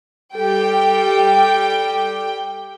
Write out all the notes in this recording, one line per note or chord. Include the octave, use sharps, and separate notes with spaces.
G3 G4 A4 G5